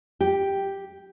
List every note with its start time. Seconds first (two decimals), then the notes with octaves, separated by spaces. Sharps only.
0.21 G4